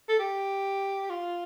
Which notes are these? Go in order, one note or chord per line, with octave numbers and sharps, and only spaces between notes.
A4
G4
F4